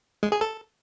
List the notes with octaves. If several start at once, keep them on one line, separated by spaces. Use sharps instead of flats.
G#3
G#4
A4